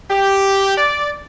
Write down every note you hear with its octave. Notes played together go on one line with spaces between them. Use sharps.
G4
D5